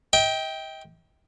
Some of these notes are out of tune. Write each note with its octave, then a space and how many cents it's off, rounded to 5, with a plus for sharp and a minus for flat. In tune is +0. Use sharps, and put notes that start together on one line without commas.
D#5 +45 G5 +0